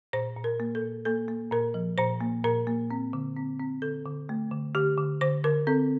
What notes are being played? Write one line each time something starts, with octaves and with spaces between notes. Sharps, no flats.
A#2 C5
A#2
A#4
A#3
A4
A#2
A#3 A4
A#3
A#2 A#4
F3
A#2 C5
A#3
A#2 A#4
A#3
C4
D3
C4
C4
D3 A4
D3
A3
D3
D3 G4
D3
D3 C5
D3 A#4
C4 A4